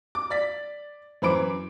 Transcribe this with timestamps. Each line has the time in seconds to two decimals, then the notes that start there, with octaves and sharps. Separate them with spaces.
0.15 D6
0.30 D5 A6 B6
1.22 F#2 E3 C5 B5 D6 D7